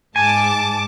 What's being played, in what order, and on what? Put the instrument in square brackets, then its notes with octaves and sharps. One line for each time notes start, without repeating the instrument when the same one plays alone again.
[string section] G#2 A5 D6 [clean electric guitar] G#5